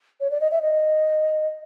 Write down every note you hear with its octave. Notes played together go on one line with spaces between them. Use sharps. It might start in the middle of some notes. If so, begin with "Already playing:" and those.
C#5
D5
D#5
E5
D#5